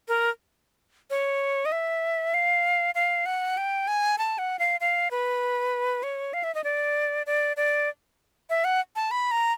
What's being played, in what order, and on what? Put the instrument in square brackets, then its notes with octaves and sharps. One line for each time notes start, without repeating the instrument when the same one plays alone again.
[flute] A#4
C#5
D#5
E5
F5
F5
F#5
G5
G#5
A5
F#5
F5
F5
B4
C#5
F5
E5
D#5
D5
D5
D5
E5
F#5
A5
B5
A#5